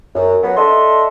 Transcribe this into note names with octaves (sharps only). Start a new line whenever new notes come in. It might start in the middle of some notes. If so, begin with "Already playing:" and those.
F#2
F#3 B3
D4 A4 D#5 E5 C6